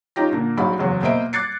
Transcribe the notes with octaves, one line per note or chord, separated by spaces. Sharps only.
C#4 D#4 F4 G4 A#6
A#2 D3 A#3
A#1 G#2 F#3 F#4 F5 B5
F#1 E2 F#3 G#3
B2 A#3 C5 D#5 E5 D7
D6 F#6 G#6 A6 C7 C#7